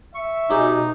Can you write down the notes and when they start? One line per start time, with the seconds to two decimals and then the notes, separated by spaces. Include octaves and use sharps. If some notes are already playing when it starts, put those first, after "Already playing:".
0.15 E5 C#6
0.50 B2 C#4 D#4 G4 G#4